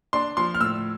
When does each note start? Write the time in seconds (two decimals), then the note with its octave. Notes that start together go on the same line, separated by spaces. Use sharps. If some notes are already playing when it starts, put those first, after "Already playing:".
0.13 D4 C6
0.37 F3 C6
0.54 F6
0.60 A2 E6